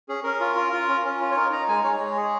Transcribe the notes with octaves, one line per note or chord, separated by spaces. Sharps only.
C#4 G#4
C#4 A#4
F4
F4
F4
C#4
C#4
F4
C#5
D#4 A#4
D#4 A#5
G#3 G#5
G#3 C#5
G#3
G#4